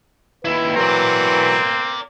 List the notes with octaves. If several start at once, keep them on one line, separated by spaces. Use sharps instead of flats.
D#2 E4 B4
E3 F#3 C4 A#4 D5